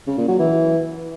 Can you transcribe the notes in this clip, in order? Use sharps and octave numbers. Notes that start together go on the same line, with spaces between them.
C#3
A#2
F#3
E3